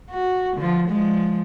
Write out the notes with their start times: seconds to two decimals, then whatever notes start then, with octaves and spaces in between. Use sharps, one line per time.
0.10 F#4
0.57 D3 F3
0.88 F3 G#3